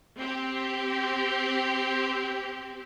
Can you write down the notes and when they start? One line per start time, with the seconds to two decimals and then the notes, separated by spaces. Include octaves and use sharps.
0.20 C4 G4